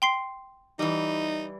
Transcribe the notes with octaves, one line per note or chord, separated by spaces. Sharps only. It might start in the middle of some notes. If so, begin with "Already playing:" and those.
G5 C6 C7
E3 G3 D#4